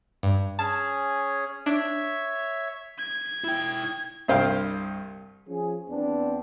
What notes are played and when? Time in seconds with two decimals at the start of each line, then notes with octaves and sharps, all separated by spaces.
0.23 G2
0.59 C#4 G#4 C#5 A5
1.66 D4 C#5 E5
2.99 G#6
3.44 E4 G5
4.28 C2 G2 C5 F5 G5
5.49 F3 C#4 G#4
5.90 E2 B3 C4 D4